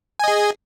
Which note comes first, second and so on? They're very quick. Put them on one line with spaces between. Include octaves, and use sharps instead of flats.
G#5 D#5 G#4